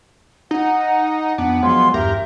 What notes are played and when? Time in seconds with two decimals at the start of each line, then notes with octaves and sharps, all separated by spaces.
0.51 D#4 F#5
1.38 F2 B3 D4 F#5
1.63 F3 F#3 G#3 C6
1.94 E2 G2 G4 A#4 E5